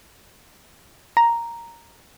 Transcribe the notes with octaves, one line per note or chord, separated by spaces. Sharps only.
A#5